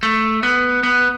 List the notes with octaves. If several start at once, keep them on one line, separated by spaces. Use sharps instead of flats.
A3
B3
B3